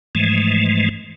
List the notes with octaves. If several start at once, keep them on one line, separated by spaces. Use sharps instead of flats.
G#2 E3 F3 G#3 A3